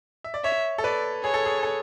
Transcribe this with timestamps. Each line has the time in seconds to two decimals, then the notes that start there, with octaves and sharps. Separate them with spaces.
0.24 E5
0.34 D5
0.44 C#5 E5
0.78 A4
0.84 B4 D5
1.24 G#4 C#5
1.34 A4
1.45 G#4
1.63 A4